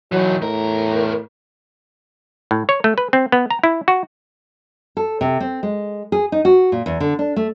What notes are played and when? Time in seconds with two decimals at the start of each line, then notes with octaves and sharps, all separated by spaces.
0.12 E3 F#3 D#4
0.42 E2 A2 A#4
2.51 A2
2.69 C#5
2.84 A3
2.98 B4
3.13 C4
3.32 B3
3.50 A#5
3.64 E4
3.88 F#4
4.97 A4
5.21 C3
5.40 C4
5.63 G#3
6.12 G#4
6.32 D#4
6.45 F#4
6.72 A#2
6.86 E2
7.00 D3
7.19 D4
7.36 A3